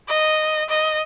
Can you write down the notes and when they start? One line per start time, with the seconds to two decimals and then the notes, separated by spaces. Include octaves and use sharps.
0.08 D#5
0.69 D#5